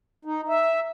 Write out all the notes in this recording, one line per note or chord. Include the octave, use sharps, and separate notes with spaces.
D#4
E5